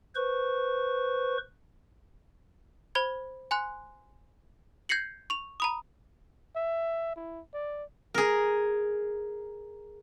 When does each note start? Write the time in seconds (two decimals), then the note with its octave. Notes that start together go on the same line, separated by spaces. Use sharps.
0.15 B4 C5 C#6
2.95 C5 B5 G#6
3.51 G#5 C6 F#6
4.89 G6 G#6 A#6 C7 C#7 F#7
5.30 C#6 F7
5.60 A#5 B5 D#6
6.56 E5
7.16 E4
7.54 D5
8.14 G#4 A#4